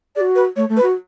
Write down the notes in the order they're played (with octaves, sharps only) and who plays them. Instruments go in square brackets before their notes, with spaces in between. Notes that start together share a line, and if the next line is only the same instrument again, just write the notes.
[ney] G#4 [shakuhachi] D5
[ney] F#4
[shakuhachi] B4
[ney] A3 [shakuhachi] C#5
[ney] A3
[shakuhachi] B4
[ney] F#4